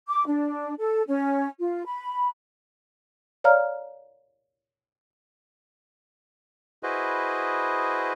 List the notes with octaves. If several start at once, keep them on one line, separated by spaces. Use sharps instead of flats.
D6
D4
A4
C#4
F4
B5
C#5 D5 F5 A#5 F6
E4 F#4 G#4 B4 C5 D#5